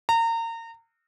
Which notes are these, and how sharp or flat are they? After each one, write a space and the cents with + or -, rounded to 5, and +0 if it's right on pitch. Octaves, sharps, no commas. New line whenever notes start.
A#5 -30